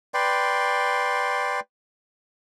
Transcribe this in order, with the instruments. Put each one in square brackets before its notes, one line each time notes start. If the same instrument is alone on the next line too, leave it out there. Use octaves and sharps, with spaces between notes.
[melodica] B4 D5 G5 C6